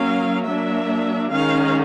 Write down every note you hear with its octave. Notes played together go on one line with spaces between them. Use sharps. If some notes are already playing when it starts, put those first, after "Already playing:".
Already playing: F#3 A#3 C#4 F5
F#3 A#3 D4 E5
D#3 G#3 C#4 F5